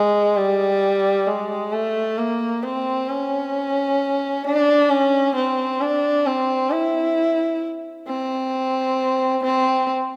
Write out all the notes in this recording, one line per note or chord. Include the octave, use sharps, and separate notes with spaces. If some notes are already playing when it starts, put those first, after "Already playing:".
Already playing: G#3
G3
G#3
A3
A#3
C4
C#4
D4
C#4
C4
D4
C4
E4
C4
C4